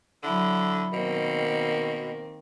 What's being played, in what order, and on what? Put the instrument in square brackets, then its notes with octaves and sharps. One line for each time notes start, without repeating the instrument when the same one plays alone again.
[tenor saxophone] D3 [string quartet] F#3 E4
[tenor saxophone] B2 [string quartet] D#3 A#3 C4